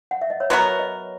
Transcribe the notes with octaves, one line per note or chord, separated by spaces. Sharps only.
F#5
E5
D#5
C#5
F#3 B3 F#4 A#4 B4
D#5